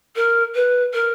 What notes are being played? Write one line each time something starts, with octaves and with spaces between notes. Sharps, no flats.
A#4
B4
A#4